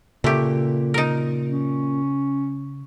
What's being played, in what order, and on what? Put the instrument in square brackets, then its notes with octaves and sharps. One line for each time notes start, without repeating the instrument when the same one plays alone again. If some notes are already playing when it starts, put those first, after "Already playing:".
[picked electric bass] A#2 [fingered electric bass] C#3 [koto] A3 G4
[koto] D#4 A#4
[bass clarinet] C#4